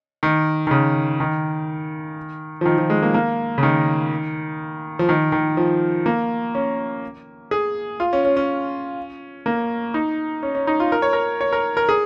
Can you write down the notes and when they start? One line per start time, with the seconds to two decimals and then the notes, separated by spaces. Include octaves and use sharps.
0.23 D#3
0.67 D#3
0.71 C#3
1.20 D#3
2.61 F3
2.65 D#3
2.78 F3
2.90 G#3
3.02 A#3
3.14 A#3
3.58 C#3
3.63 D#3
4.99 F3
5.09 D#3
5.32 D#3
5.57 F3
6.06 A#3
6.55 C#4
7.51 G#4
8.00 F4
8.13 C#4
8.25 C#4
8.37 C#4
9.46 A#3
9.94 D#4
10.43 C#4
10.55 C#4
10.67 D#4
10.80 F4
10.92 A#4
11.02 C#5
11.13 A#4
11.41 C#5
11.52 A#4
11.77 A#4
11.89 G#4